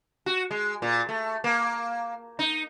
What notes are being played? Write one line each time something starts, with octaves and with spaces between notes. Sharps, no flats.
F#4
G#3
A#2
A3
A#3
D#4